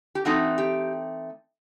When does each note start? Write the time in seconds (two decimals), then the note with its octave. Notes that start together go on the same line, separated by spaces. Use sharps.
0.15 G4
0.25 E3 A3 C4 D#4 F#4
0.58 G4